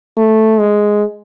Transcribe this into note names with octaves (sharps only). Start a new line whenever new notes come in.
A3
G#3